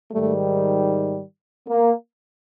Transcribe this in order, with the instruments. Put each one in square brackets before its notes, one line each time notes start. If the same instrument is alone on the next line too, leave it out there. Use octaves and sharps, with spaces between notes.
[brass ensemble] G#2 D#3 G3 A3
A#3